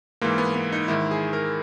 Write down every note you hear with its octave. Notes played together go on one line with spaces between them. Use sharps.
G#2 E3 A#3
B3
B3
D#4
G#2 D#3 E4
G#4
A#4